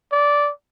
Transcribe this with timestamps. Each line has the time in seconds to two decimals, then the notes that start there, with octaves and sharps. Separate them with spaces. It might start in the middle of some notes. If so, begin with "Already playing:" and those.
0.12 D5